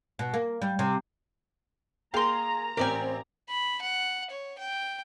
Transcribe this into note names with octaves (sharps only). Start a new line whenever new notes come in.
B2
A#3
G3
C3
A#3 G#4 F5 G5 A#5 C6
A1 C4 G4 A#4 D5 G5 G#5
B5
F#5
C#5
G5